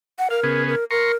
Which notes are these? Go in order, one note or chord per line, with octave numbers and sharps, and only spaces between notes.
F#5
A#4 F5
C#3 B3 G#4
A#4
A#4 A#5 C6 C#6